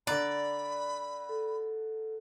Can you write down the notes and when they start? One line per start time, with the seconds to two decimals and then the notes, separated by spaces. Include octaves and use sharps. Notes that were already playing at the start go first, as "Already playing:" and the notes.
0.07 D3 D5 A#5 B5 F#6
1.29 A4